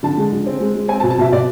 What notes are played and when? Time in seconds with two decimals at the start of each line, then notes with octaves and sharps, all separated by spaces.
0.03 D3 A5
0.17 G#3
0.32 D3
0.46 C4
0.60 G#3
0.75 G#3
0.88 C4 G#5
1.00 A5
1.03 B2
1.10 A5
1.18 B2 E5
1.32 B2 D5